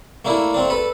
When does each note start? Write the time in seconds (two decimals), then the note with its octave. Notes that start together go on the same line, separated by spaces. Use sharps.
0.25 A3 A#3 D4 E4
0.54 A3 C4 D4
0.70 A4 B4